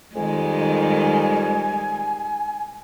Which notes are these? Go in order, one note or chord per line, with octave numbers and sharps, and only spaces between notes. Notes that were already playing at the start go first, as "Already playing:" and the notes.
F2 D#3 G3 G#3 G#5